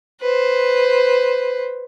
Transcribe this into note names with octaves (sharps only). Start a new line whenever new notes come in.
B4 C5